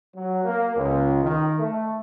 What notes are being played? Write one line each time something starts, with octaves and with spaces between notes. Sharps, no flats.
F#3
A#3
C#2
D#3
A3